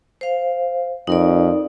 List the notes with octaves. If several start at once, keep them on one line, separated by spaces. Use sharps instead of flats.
C5 F5
F2 D#4 A#4 D5